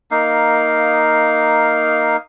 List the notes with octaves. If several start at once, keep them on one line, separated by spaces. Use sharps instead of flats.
A#3 D#4 F5